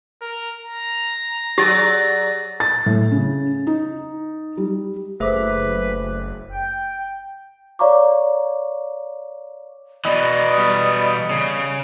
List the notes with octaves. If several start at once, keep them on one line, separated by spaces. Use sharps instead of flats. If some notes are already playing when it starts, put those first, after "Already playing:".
A#4
A#5
F#3 G4 G#4 D5 A6 A#6
A6
A2
C#3
D#4
G3
F#1 A3 G#4 B4 C5 E5 D6
G5
C#5 D5 F5 A#5 C#6 D6
B2 E3 D5 D#5
G3 B3
C#3